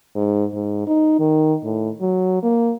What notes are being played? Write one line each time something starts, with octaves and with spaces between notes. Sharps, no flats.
G#2
G#2
D#4
D#3
A2
F#3
A#3